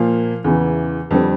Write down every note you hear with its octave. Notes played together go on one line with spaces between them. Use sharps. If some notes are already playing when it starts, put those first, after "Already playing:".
Already playing: A#2 F3 A#3 F5
E2 C#3 E3
F2 D3 G3 C4